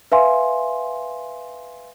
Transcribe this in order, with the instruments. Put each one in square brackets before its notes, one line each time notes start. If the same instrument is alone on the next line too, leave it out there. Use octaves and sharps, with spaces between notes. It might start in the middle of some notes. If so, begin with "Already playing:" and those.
[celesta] B4 E5 F5 G#5 C6